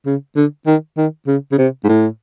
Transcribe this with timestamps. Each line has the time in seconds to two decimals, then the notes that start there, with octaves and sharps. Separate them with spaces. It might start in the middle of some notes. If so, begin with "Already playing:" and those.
0.06 C#3
0.36 D3
0.66 D#3
0.97 D#3
1.27 C#3
1.52 C#3
1.58 C3
1.84 G#2
1.89 A2